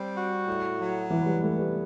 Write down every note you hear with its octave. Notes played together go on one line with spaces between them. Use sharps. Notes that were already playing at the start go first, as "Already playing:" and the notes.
Already playing: G3 C4
F#4
A2
F#3
E3 B3
G3
A3 B3
G3